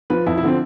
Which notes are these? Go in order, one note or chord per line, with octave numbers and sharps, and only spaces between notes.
F3 B4
F2 E4
E4
D3 F3 C4